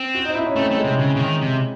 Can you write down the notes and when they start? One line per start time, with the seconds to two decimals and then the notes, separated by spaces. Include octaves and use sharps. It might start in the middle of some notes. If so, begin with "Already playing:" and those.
Already playing: C4
0.15 F#4
0.25 D#4
0.35 E4
0.46 C#4
0.56 A3 C4
0.71 A3
0.77 G#3
0.84 C3
0.99 C#3
1.16 C#3
1.20 D#3
1.41 C3